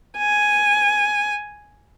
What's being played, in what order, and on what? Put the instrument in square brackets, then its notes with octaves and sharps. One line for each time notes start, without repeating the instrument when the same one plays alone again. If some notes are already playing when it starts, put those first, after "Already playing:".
[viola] G#5